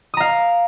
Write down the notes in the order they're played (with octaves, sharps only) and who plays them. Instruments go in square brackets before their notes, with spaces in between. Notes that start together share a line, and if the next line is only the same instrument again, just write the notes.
[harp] D#6
A#5
F5